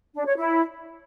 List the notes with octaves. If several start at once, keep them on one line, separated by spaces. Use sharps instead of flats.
D4
C#5
E4